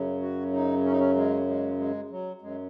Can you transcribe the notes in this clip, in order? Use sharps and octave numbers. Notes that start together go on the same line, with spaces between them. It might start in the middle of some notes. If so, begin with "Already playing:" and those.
Already playing: F#2 C#3 F#3
F#4
D#4
C#4
D#4
C#4
G#3
G#3
G#3
F#3
F#2 F#3 G#3